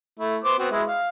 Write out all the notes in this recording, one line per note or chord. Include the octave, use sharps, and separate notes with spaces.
A3 E4
B3 C5 D6
B3 C4 F#4
G#3 E4
F5